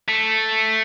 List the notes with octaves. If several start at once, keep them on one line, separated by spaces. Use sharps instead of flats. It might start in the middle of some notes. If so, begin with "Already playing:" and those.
A3